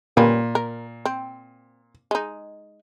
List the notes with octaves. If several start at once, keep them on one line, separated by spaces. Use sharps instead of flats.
A#2 G3 C#4 B4
A#4
C4
G#3 D#4